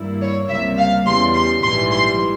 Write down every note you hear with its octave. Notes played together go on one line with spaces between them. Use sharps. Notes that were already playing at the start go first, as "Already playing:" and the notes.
Already playing: G#1 G2 G3 A#3 E4
C#5
C#2 C3 G3 A#3 E5
F5
E2 C#3 E3 G3 C6
C6
A#1 G#2 E3 G3 C6
C6